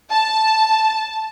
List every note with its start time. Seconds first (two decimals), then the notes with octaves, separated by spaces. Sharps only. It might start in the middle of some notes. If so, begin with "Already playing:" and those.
0.11 A5